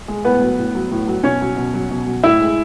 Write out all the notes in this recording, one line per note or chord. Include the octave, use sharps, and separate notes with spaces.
G#3
A2 B3 B4
F#3
A2
F#3
A2
F#3
B2 C#4 C#5
F#3
B2
F#3
B2
F#3
A2 E4 E5
G#3